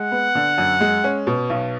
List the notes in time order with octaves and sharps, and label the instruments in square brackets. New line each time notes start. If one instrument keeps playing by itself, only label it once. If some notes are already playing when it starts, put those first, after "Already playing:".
Already playing: [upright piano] G#3 [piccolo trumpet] F#5
[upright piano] B3
D3
F#2
G#3
C#4
B2
B1